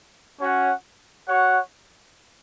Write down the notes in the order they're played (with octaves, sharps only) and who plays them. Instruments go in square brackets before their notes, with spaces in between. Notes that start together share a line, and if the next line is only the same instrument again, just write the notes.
[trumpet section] C#4 F#4 C#5 F#5
F#4 C#5 F#5